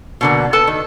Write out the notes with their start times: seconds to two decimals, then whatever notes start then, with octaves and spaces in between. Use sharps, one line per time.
0.21 B2 D3 A#3
0.53 A4 B4 A5
0.67 D#3